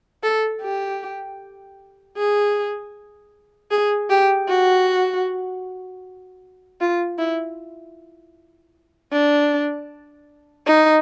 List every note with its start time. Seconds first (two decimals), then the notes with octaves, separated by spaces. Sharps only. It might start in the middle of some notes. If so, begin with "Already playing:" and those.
0.23 A4
0.62 G4
2.17 G#4
3.71 G#4
4.10 G4
4.49 F#4
6.81 F4
7.19 E4
9.12 D4
10.66 D#4